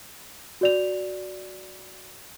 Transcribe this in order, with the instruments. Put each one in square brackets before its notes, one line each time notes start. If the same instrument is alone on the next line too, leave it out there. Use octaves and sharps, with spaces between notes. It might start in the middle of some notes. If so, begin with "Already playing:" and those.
[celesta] F#4 D5 F7